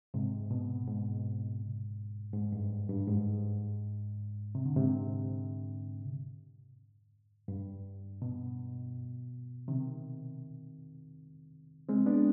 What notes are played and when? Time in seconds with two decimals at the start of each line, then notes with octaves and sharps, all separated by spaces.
0.14 G#2 C3
0.51 B2
0.87 G#2
2.33 G#2
2.52 G2
2.89 G2
3.07 G#2
4.55 C3
4.66 D3
4.76 G#2 C3
7.48 G2
8.22 B2
9.68 C3 D#3
11.89 G#3 C4
12.06 B3 D4